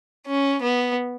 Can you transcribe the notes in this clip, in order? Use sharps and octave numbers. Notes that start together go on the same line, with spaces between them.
C#4
B3